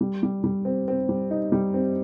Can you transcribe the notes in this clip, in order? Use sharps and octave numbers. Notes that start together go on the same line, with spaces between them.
G3
G3
G3
C4
C4
G3
D#4
G3
C4